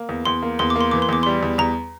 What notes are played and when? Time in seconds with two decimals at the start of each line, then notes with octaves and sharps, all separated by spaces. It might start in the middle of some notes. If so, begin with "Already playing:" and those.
Already playing: A#3
0.09 E2
0.25 E2 C6
0.42 A#3
0.59 E2 C6
0.70 D6
0.75 A#3
0.81 C6
0.91 E3 D6
1.02 C6
1.09 E2 D6
1.23 G3 C6
1.43 E2
1.58 E2 A#5